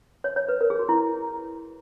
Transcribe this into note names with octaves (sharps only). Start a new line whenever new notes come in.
C#5
C#5
B4
A#4
G#4
F#4
E4